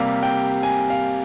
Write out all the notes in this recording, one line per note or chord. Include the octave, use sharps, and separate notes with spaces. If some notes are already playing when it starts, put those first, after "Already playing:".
Already playing: C3 G3 A#3 F5
G5
G#5
F5